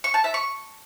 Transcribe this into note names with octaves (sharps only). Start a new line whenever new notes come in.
C#6
A5
E5
C#6